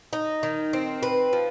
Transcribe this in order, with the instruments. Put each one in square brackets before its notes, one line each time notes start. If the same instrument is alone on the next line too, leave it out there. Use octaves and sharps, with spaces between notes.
[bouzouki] D#4
D#3
C4
B4
F3